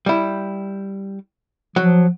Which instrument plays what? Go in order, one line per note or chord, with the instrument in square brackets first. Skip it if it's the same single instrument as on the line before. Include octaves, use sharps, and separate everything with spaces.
[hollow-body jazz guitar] G3 E4
[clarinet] F3 [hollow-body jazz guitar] F#3